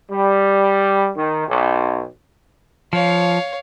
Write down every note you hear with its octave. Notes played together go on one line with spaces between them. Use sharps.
G3
D#3
B1
F3 C#5 F5